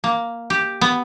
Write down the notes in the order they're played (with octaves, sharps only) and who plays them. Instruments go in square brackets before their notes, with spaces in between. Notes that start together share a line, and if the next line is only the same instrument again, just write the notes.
[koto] A#3
G4
B3